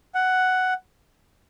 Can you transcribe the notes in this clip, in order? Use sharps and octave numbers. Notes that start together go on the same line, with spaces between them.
F#5